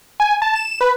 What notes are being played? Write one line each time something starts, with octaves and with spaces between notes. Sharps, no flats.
G#5
A5
E7
B4